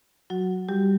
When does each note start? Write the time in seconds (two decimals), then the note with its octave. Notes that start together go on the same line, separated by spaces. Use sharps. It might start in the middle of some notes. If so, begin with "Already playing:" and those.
0.30 F#3 F#4
0.69 G3 G4